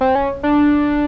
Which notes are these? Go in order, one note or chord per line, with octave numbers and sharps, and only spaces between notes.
C4
C#4
D4